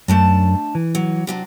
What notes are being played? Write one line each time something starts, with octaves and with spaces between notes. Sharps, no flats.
F#2 A3 D4 A5
E3
F#3
C3 F#3 D4